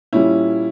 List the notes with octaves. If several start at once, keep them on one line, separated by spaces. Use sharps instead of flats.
A#2 G3 C#4 E4